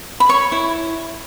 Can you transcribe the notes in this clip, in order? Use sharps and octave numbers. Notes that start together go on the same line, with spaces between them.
B5
C#5 C#6
E4